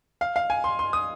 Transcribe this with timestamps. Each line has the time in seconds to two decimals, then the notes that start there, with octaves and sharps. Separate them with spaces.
0.21 F5
0.36 F5
0.50 G#5
0.64 C6
0.79 C6
0.93 D#6